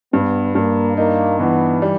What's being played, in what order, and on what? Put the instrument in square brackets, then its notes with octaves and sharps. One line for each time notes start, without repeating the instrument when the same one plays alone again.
[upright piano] G2 [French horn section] B3
[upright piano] G2 [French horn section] A#3
[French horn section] A#3 [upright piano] D#4
[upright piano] E3 [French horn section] B3
[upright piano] G3